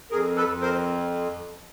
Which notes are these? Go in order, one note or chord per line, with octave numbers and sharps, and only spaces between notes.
F2 G#4 A#4
A4 B4
F2
A#4 C5